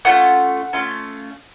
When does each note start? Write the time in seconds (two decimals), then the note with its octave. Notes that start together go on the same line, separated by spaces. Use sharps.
0.05 A3 C#4 F4 F#5
0.73 A3 C#4 F4